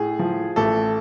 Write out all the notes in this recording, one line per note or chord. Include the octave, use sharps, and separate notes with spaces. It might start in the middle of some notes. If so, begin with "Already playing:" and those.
Already playing: A2 G#4
F3
A1 A3 A4